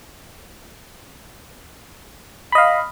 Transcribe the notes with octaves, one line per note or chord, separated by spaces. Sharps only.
D#5 F5 B5